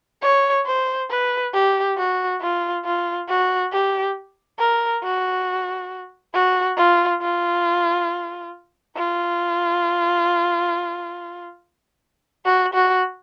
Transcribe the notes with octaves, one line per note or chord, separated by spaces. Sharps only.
C#5
C5
B4
G4
F#4
F4
F4
F#4
G4
A#4
F#4
F#4
F4
F4
F4
F#4
F#4